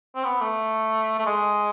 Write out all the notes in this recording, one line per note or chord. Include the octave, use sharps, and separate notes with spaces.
C4
B3
A3
A3
G#3